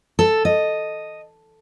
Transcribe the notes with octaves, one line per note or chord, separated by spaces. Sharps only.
A4
D#5